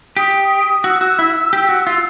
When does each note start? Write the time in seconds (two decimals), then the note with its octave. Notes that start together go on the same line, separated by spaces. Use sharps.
0.17 G4 D#6
0.84 F#4 E6
1.01 F#4
1.19 E4
1.53 G4
1.69 F#4
1.87 F4